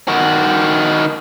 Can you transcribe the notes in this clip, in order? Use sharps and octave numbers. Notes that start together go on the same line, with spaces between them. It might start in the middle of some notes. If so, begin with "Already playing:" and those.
D#3 F#4